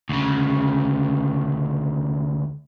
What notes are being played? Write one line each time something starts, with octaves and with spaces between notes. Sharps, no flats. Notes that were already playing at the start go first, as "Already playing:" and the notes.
D2 C#3